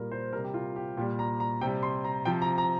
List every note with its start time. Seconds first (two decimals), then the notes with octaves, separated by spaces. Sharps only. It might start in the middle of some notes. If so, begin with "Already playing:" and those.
Already playing: A#2 G3 A#4
0.12 C5
0.33 C3 G3 A#4
0.45 G4
0.54 F4
0.76 G4
0.97 A#2 G3 G4
1.19 A#5
1.40 A#5
1.61 C3 G5
1.66 G3
1.83 C6
2.04 A#5
2.25 C3 F3 G5
2.42 A#5
2.58 A#5